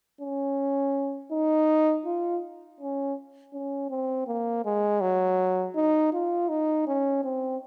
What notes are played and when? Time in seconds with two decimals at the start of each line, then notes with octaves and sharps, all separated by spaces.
0.21 C#4
1.32 D#4
2.05 F4
2.80 C#4
3.53 C#4
3.90 C4
4.27 A#3
4.65 G#3
5.01 F#3
5.75 D#4
6.13 F4
6.49 D#4
6.87 C#4
7.24 C4